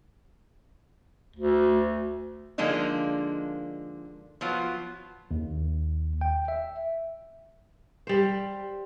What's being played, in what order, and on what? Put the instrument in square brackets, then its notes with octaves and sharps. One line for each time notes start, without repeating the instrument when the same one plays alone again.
[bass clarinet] D2
[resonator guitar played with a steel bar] D3 F3 G#3 A#3 D4 D#4
F3 F#3 B3 F4
[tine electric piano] D#2
G5
E5
[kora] G3 C5